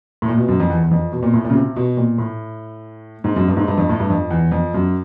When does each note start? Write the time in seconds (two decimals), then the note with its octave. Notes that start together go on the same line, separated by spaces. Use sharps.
0.22 A2
0.28 A#2
0.38 B2
0.48 F#2
0.60 F2
0.70 E2
0.83 E2
0.91 F2
1.13 B2
1.23 A#2
1.34 A2
1.44 A#2
1.50 C#3
1.55 C3
1.76 B2
1.97 A#2
2.18 A2
3.24 G#2
3.36 F#2
3.48 G2
3.57 G#2
3.68 G2
3.77 F2
3.89 A2
4.00 G2
4.10 F2
4.31 E2
4.52 F2
4.74 F#2